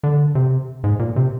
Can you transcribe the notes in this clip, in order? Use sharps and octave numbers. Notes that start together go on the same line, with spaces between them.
D3
C3
G#2
A#2
C3